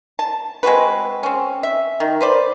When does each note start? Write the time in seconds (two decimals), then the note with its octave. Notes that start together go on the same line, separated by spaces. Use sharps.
0.19 A5
0.63 G#3 C4 F#4 B4
1.23 C4 C#4
1.63 E5
2.00 D#3
2.21 B4 C5 D5